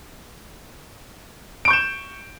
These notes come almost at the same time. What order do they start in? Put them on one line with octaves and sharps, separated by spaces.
D7 C#6 G6 E7